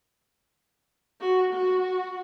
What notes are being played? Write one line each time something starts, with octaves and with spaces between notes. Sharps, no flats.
F#4
F#4